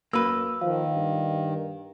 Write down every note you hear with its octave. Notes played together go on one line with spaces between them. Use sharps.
F#2 A#3 B4 E6
D#3 F3 F5
G2